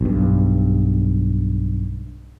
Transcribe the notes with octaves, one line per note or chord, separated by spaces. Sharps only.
B1 G2